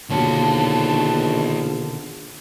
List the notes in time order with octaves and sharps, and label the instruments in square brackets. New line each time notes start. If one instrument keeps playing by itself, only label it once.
[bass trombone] A#1 [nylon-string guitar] B2 D3 A#3 [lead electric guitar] D#3 C#5 [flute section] A5